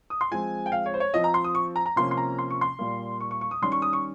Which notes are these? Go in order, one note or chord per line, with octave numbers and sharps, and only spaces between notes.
D#6
C6
F3 G#3 C4 G#5
G5
F5
C#5
C5
C#5
F3 C4 D#5
A#5
C6
D#6
C#6
A#5
A#5
C3 F3 A#3 C#4 C6
C6
A#5
C6
C#6
C6
A#2 G3 A#3
C#6
C#6
C#6
D#6
D#3 G3 C#4 C6
C#6
D#6
C#6